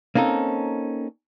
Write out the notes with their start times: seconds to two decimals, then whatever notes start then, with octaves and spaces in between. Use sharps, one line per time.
0.15 A#3 C4 C#4 D#4 A4